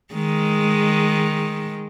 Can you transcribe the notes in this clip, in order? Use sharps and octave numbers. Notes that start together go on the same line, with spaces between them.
D#3 G#3